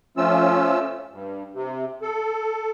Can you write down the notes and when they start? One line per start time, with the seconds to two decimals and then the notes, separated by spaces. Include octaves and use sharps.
0.17 F3 A3 C#4 F4 E6
1.12 G2
1.54 C3
2.02 A4